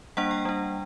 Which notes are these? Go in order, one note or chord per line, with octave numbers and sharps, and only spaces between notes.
G3 A#3 D4 F#5
G5
G3 D4